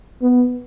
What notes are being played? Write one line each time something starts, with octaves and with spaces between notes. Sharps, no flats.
B3